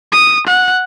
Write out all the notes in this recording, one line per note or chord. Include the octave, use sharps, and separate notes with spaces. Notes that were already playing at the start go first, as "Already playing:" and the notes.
D#6
F#5